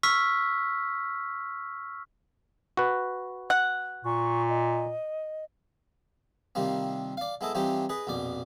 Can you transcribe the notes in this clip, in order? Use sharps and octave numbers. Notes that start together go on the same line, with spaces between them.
C#6 E6 F6 B6
F#4 B4
F#5
A#2 C#6
D#5
C3 D#3 F3 G3 A#3 C4
D5 F5
G#3 B3 E4 A4 D#5
E3 F3 G3 C4 D#4 G4
G#4 B4 D#5
A#1 F2 B2 D5